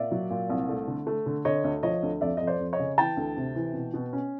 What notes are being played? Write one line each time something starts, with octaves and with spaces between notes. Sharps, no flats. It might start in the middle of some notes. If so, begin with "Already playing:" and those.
Already playing: A#2 D5 E5
F#3
A#2
C2
A3
D3
A3
D3
D3 C#5 D#5
D2
F3 C#5 D#5
D2
F2 D5 E5
F2 D#5
C5 D5
F2
C#5 D#5
C#3
E3 G5 A5
D2
C3
E3
B2
B2
C#4